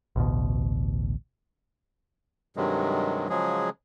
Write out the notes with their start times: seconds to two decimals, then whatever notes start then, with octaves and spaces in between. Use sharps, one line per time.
0.16 A1 D2 B2
2.57 G2 C3 D#3 F#3 G#3
3.30 C#3 F3 F#3 G#3 G#4